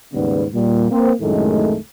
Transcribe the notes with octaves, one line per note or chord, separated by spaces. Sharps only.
D#2 G#2 C#3 G3 B3
A#2 G3
A#3 C4
C2 F#2 A2 D#3 G#3 A3